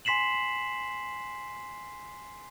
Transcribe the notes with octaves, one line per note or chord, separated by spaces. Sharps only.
G#5 C6 B6 C7 E7 F#7